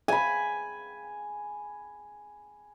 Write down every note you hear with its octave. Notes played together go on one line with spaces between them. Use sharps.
G#5 B5